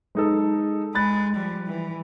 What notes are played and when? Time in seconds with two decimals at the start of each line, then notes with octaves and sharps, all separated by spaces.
0.15 G#3 D#4 A4
0.95 G#3 B5 F#6 A6
1.34 F3 G3
1.67 E3